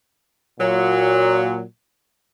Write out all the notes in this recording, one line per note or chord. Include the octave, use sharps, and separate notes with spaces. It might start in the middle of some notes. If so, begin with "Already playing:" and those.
A#2 F#3